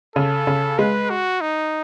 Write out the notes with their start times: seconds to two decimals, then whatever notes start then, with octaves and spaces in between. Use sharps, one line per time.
0.16 C#3 A4
0.47 C#3
0.79 G#3 B4
1.10 F#4
1.41 D#4